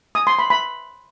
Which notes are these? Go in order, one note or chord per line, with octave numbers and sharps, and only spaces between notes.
D#6
C6
B5
B5